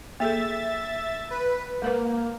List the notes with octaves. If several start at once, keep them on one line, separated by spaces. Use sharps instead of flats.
A#3 G#4 A4 E5 A6
B4
G#3 A#3 A#4 B4